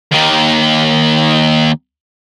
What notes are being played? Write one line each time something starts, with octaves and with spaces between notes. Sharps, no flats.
D#2 D#3